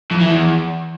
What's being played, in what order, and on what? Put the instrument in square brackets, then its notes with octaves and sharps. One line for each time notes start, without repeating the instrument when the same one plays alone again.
[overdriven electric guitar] F2
E3
E2